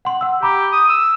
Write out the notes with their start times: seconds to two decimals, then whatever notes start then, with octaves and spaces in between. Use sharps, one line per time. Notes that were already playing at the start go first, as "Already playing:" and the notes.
0.05 F#5 C6
0.21 F#5 E6
0.42 G4 A#5 B5 D6
0.72 D#6
0.89 E6